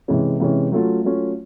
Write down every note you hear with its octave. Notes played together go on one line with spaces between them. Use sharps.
C3 E3 G#3 C#4
C3 E3 G#3 C#4
F#3 A3 C#4 F4
F#3 A3 C#4 F4